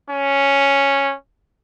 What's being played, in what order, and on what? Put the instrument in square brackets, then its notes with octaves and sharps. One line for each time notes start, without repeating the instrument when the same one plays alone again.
[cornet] C#4